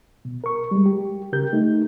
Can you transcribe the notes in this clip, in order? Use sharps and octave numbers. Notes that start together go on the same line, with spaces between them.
B2
A#4 C#6
G3 G#3
G4
C#3 G4 A#4 G6
A3 D#4